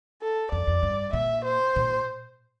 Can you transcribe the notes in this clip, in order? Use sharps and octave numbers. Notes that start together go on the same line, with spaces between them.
A4
F2 D5
F2
G2
A#2 E5
C5
A#2